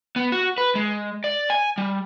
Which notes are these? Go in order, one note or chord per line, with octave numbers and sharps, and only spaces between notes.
B3
F#4
B4
G#3
D5
G#5
G3